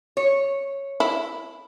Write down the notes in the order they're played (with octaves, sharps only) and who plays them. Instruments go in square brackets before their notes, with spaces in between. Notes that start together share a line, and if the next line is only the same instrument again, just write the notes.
[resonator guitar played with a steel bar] C#5
[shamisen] E4